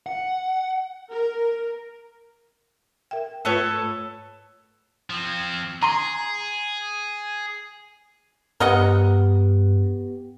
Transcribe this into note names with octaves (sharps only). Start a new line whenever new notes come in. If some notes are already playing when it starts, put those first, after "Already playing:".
F#5
A#4
A#4 E5 G5
G#2 A3 F4 A4 B4 C#5
F3 C4
G#4 A#5 C6
G2 B3 G4 A#4 D#5 F#5